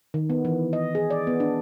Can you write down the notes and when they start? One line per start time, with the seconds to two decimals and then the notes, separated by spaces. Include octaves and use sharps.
0.14 D#3
0.30 B3
0.45 E3
0.73 D#5
0.95 G#4
1.10 D5
1.27 B3
1.40 D4